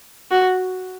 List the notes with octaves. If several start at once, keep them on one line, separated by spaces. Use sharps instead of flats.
F#4